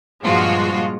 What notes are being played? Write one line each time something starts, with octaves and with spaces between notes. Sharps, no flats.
G2 A#2 F3 G#3 F4 F#4